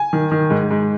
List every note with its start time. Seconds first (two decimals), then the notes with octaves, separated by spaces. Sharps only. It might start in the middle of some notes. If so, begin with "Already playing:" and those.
Already playing: G#5
0.13 D#3
0.32 D#3
0.50 G#2
0.71 G#2